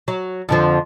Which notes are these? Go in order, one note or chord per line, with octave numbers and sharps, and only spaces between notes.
F#3
F2 D3 F3